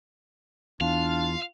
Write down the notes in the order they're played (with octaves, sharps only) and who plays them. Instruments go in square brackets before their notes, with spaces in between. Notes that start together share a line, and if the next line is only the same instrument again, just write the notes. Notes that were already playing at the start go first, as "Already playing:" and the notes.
[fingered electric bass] E2 [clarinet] D4 [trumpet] F4 [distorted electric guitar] F5